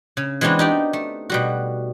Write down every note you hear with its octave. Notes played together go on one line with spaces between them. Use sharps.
C#3
E3 G#3 B3 C4 D4 F#4
D#4 G4 D5
A3
B2 G3 F#4